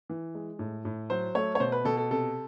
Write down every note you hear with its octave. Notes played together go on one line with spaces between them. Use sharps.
E3
G#3
A2
A2
F#3 C5
A3 C#5
C#5
B2 C5
B4
B2 A4
A4
C3 A4